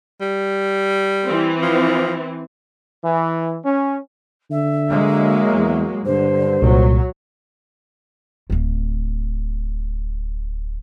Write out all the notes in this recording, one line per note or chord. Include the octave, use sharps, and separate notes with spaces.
G3
E3 C4
F3
E3
C#4
D3 E5
F#3 G#3 A#3
E2
G2 D3 C5
C2 A#2 F#3
D1 A3